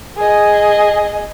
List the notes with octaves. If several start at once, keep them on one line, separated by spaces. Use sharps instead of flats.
G#4 D#5